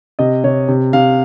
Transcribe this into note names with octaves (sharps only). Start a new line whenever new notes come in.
C3 D#5
C3 C#5
C3
C3 F5